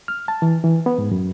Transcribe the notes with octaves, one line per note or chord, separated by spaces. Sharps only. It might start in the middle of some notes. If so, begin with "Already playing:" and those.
F6
A5
E3
E3
B3
G#2
F#2